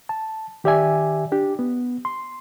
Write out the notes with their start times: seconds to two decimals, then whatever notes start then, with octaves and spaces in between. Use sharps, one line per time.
0.09 A5
0.64 D#3 G4 D5 E5 G#5
1.32 D4 G4
1.59 B3
2.05 C6